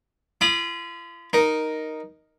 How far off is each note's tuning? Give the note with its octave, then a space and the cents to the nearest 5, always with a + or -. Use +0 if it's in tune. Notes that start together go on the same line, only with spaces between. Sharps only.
F4 -45 B5 -25 D#6 -25
D#4 +0 A#4 +5